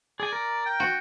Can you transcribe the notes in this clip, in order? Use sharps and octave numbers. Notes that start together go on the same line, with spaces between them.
G#4 D5 G#5
A#4
G5
F#4